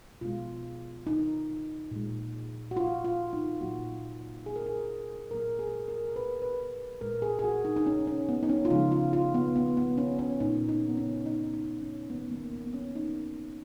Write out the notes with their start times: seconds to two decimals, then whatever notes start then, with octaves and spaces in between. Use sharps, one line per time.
0.21 B2 G#3 F4
1.07 D#4
1.92 A#2 G#3
2.71 F#4
2.77 F4
3.05 F4
3.33 D#4
3.61 A#2 F#3 A#3 F#4
4.46 G#4
4.56 A#4
4.66 G#4
5.31 A#2 F#3 A#3 A#4
5.59 G#4
5.88 A#4
6.16 B4
6.42 B4
7.01 A#2 G#3 A#4
7.22 G#4
7.39 G#4
7.44 F#4
7.65 D#4
7.76 D#4
7.86 C#4
8.07 C#4
8.29 B3
8.43 D#4
8.49 C#4
8.65 F4
8.70 C#3 F3 G#3 D#4
8.92 F4
9.13 F4
9.34 B3
9.56 B3
9.77 B3
9.98 C#4
10.19 C#4
10.40 A#2 G#3 D#4
10.69 D#4
10.89 B3
10.97 C#4
11.26 D#4
11.54 D#4
11.82 C#4
12.10 D#3 A#3 B3
12.31 A#3
12.53 B3
12.66 B3
12.74 C#4
12.95 D#4